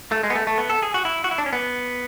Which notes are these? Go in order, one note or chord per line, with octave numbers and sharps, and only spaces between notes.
A3
G#3
B3
A3
A3
B3
A4
G#4
F#4
E4
F#4
E4
D4
C#4
B3